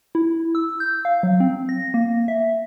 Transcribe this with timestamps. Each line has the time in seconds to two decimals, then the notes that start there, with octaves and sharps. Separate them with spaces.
0.15 E4
0.55 E6
0.80 G6
1.05 F5
1.23 F#3
1.40 C4
1.69 A#6
1.94 A#3
2.28 E5